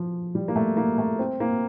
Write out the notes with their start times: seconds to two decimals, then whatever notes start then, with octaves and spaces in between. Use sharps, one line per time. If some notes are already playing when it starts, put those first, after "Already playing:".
Already playing: F3
0.35 G3
0.48 A#3
0.56 A3
0.77 A#3
0.98 A3
1.19 C4
1.40 A#3